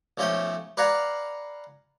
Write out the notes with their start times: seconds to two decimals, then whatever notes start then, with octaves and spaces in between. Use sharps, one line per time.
0.17 B1 F3 A3 C#4 G5
0.77 B4 D5 F5 F#5 G#5 A#5